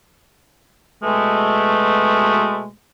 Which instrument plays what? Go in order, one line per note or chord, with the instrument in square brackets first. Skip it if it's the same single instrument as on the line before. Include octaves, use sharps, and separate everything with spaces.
[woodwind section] B2 G#3 A3